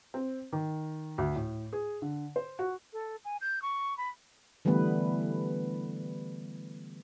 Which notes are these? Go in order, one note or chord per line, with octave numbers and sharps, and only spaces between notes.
C4
D#3
D2
A2
G#4
D3
C5
F#4
A4
G#5
G6
C#6
B5
D3 E3 G3 A3 B3 B4